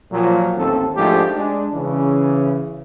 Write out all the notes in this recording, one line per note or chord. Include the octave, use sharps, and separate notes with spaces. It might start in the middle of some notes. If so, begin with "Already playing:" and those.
A#2 F3 F#3
A1 D#2 C4 A4
G#2 F3 A3 D4 D#4 G4
G#3 D4
C#3 E3